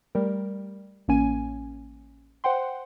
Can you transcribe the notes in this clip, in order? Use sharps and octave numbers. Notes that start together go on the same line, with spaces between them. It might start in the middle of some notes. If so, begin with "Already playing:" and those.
G3 A3 A#4
A1 A#3 C#4 G#5 D#7
C5 F#5 G5 C6